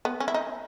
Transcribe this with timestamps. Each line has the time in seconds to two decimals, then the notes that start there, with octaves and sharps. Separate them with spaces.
0.05 B3
0.20 C#4
0.28 E4
0.34 D#4